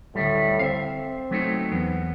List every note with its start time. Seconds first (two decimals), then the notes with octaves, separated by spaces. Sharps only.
0.15 D2 A2 G3
0.59 C4 E5 F5
1.31 F#3 A3 D#4
1.71 E2 B3